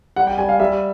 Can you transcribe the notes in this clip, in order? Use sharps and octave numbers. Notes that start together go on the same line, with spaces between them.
G3 F#5
G5
G3 G#5
F5
G3 E5